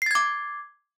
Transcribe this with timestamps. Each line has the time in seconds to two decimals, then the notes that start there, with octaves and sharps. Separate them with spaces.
0.02 C7
0.06 A6
0.11 G#6
0.15 D6